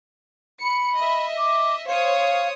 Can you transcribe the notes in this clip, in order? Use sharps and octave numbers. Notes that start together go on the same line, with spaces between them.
B5 C#7
D#5 E5
D6
C5 C#5 F5 D#6